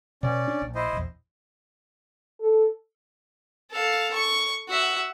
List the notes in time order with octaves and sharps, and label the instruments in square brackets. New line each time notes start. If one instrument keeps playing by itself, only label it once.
[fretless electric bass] B2 [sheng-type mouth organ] C#4 D5
[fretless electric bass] D4
A#1
[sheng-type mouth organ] E4 C5 D#5
[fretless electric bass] A#1 E2
[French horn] A4
[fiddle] A4 F5
C#6
F#4 E5